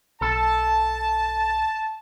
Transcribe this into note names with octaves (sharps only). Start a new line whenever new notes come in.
B1 A4 A5